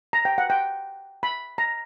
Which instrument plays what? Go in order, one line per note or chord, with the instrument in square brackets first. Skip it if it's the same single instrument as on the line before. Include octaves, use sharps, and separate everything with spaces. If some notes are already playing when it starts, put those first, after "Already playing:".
[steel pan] A#5
G5
F#5
G5
B5
A#5